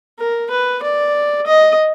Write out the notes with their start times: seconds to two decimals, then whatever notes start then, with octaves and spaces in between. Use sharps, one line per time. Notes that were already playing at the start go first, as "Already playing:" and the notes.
0.20 A#4
0.50 B4
0.83 D5
1.47 D#5